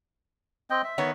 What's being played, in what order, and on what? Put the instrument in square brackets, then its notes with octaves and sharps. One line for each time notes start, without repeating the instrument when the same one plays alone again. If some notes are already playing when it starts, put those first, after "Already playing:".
[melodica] C4 D#5 G5
E5
[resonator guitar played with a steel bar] D#3 B3 C#5